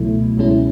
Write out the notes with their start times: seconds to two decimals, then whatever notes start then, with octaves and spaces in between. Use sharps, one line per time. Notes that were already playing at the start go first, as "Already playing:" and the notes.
Already playing: C#2 B2 F#3 A3 E4
0.38 C#2 B2 G#3 C#4 E4